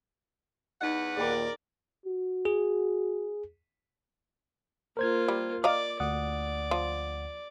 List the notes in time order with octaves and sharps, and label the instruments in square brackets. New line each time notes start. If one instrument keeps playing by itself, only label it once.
[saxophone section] E2 B4 F#5 [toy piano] D#4 D#5
[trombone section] D#2 A#2 [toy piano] G#4 G5 B5 [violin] A#4 D5
[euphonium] F#4
[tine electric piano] G#4
[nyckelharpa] A#3 F4 [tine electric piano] A#4 C5 G#6
[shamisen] G3
[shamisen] A#4 D#5 F5 [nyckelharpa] D5 [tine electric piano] D6
[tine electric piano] D2 F#5 D#6 [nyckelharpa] D5
[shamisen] F3